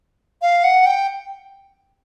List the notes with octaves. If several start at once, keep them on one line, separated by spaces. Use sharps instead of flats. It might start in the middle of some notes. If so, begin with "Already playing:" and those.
F5
F#5
G5